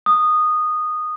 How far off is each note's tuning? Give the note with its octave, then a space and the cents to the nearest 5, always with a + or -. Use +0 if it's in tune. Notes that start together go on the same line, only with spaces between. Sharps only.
D#6 -15